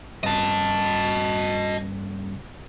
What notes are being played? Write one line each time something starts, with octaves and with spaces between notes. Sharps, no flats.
G2 C#3 D#5 A5